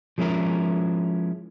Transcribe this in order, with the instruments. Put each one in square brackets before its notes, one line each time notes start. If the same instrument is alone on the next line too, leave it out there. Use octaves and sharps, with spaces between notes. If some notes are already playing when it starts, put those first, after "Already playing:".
[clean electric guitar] F3 G#3 C#4 E4 A#4